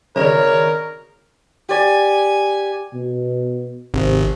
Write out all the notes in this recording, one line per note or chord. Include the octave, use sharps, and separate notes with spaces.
G#1 C#3 A#4 C#5 D5
G4 D5 G#5
B2
G#1 C3